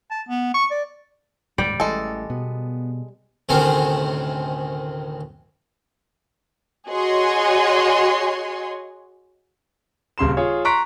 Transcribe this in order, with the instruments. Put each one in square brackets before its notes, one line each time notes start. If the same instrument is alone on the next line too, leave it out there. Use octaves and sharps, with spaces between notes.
[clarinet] A5
B3
C#6
D5
[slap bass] D#1 G#2 [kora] G3 D5 G5
[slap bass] A1 E3 [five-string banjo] G#3 A4
[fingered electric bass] B2 [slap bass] B3
[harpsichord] D2 A2 C3 D#3 C4 C#4
[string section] F#4 G#4 C#5 D#5 G#5 C6
[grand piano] D#1 C#3 C6 E7
F4 G#4 C#5
A#5 C6 C#6 F#6 B6 D7